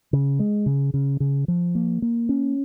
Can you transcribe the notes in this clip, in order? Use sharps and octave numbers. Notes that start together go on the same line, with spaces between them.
C#3
G#3
C#3
C#3
C#3
F3
A#3
A#3
C#4